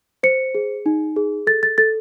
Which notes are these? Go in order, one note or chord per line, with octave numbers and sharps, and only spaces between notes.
C5 C#7
G#4
D#4
G#4
A4 A6
A6
A4 A6